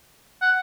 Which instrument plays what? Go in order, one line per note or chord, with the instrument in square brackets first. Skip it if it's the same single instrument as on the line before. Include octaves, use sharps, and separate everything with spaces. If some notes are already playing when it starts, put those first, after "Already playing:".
[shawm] F#5